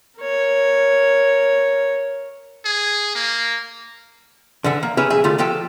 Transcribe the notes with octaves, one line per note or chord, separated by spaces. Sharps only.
A#4 C#5
G#4
A#3
D3 E3 E5 F#5
A#3
C#4 G4 G#4 B4 C#5 E5
B1 F2 G#4 E5
D3 A3 F4 G4
F3 F4 G4 A4 G5